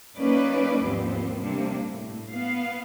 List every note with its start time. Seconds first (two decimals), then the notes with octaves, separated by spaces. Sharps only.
0.16 F#3 A#3 C#4 D#4 B4 D5
0.82 D#2 G#2 F3 B3 C4
1.38 C3 G3 A#3 D4
1.84 A2
2.32 B3 F5